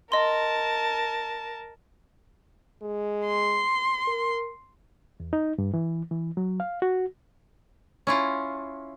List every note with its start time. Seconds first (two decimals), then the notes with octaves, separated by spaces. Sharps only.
0.12 A#4 D#5 A5 C6
2.82 G#3
3.26 C6
4.08 A#4
5.20 E2
5.33 D#4
5.58 G2
5.74 E3
6.11 E3
6.37 F#3
6.60 F5
6.82 F#4
8.07 C#4 E4 F4